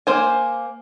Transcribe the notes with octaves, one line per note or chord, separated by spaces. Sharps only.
A#3 C5 G#5